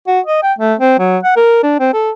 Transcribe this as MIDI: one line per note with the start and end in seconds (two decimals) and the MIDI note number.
0.07 0.20 66
0.26 0.43 75
0.43 0.53 79
0.58 0.74 57
0.79 0.97 60
0.99 1.18 54
1.23 1.36 78
1.36 1.61 70
1.63 1.80 62
1.80 1.93 60
1.94 2.11 69